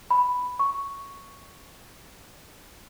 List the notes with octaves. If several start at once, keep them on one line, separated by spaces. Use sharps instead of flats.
B5
C#6